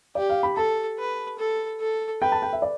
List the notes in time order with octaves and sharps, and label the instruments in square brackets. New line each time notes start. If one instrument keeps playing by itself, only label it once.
[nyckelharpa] G4 [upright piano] D5
[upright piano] F5
B5
[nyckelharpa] A4 [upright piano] A5
[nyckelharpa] B4
A4
A4
[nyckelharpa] B4 [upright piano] G5
[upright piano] A5
G5
E5
D5